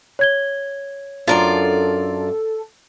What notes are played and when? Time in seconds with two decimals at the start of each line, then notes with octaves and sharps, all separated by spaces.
0.19 C#5 G#6 G7
1.28 F#2 D4 F4 A4 A#4 C5 D5